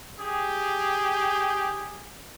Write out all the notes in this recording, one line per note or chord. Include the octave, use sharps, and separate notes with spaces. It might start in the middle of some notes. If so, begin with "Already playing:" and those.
G4 G#4